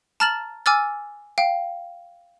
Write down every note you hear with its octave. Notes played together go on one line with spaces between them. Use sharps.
A5 A#5 F6 A6 E7 F#7
G#5 D6 E6 F6 A6
F5 G5